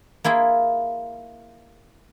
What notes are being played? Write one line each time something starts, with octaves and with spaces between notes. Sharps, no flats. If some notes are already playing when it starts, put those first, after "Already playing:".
A#3 E4 F4 G#4